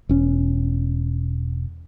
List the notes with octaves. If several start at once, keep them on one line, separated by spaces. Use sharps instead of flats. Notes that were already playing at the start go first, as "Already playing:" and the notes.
E1 C#4